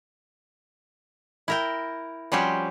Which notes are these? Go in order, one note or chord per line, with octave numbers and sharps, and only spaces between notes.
E4 A#4 G5
F3 G3 C4 C#4 F#4 G4